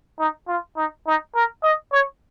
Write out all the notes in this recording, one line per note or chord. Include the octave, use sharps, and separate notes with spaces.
D#4
F4
D#4
D#4
A#4
D#5
C#5